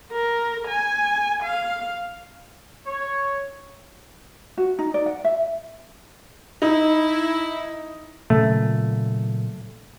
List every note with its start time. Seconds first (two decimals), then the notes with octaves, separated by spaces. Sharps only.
0.13 A#4
0.68 G#5
1.43 F5
2.86 C#5
4.57 F#4
4.79 D#4
4.94 D5
5.06 F#5
5.24 E5
6.62 D#4 E4
8.30 A#2 C#3 F#3 A3